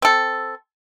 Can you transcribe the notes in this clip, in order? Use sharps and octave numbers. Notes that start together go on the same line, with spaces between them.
C4 A4